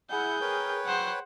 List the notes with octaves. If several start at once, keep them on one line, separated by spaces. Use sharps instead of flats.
E4 G#4 F#5 G6
A#4 B4 C#5 G5
F#3 C5 F#5